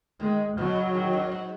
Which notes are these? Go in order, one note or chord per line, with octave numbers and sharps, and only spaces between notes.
D#3 G#3
B2 F#3
C#3
D#3
F#2
G#2